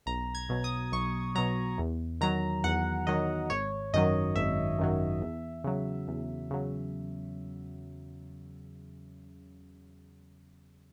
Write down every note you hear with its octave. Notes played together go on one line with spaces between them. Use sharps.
B1 A#5
G#6
B2 F#3
D#6
B1 C#6
B2 F#3 A#5
E2
D#3 F#3 A#5
E2 F#5
D#3 F#3 D#5
G#1 C#5
F#2 D#3 F#3 D#5
G#1 E5
F#2 D#3 F#3
E2
C#3 F#3
E2
C#3 F#3